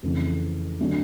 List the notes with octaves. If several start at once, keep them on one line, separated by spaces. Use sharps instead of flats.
F2 C#3 E3 A3
D3 F#3 A3 D4